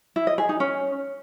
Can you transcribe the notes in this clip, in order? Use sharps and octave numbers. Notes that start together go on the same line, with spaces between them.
E4
D#5
G#4
D#4
C#4